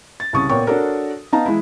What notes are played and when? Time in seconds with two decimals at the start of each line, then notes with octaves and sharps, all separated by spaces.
0.20 A6
0.33 C2 C#3 C#6 D#6 A6
0.49 A#2 A#3 B3 C#5 G5 C#6
0.66 D4 F#4 A4 A#4 C#5
1.32 B3 D#4 F5 A5 A#5
1.46 E3 G#3 E4